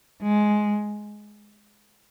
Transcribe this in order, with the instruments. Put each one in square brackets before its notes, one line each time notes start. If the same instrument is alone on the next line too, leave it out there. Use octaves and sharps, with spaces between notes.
[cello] G#3